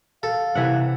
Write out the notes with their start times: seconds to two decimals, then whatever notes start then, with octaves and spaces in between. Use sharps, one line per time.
0.23 A4 F5
0.55 C3 E3 E5 F#5